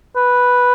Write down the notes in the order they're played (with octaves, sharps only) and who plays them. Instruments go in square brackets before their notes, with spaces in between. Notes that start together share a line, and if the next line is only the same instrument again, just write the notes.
[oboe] B4